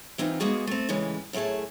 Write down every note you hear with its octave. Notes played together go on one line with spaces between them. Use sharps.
E3 C4 D#4 F4
G#3 A#3 B3 F#4 G#4
A3 C4
A2 C#3 E3 G#3 C#4
F#2 A2 A3 G#4 A5